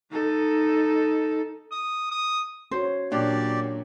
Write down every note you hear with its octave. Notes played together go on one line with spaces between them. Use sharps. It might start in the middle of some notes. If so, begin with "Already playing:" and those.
D#4 A4
D#6
D#6
C#4 F#4 C5 C#5
A#2 F#3 D4 G4 D5